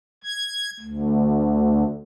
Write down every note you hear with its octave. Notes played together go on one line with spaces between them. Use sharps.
G#6
D2